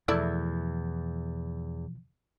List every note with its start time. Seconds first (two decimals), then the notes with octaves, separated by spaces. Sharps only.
0.08 E2 B2 E3 F3 A3 E4 D5